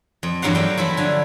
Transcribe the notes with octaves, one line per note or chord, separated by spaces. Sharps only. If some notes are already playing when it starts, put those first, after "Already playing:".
F2
E2 G2 F#3 A#4 F5 F#5
F#3 A3 G5
F3 F#3 E4 B5
D3 G#5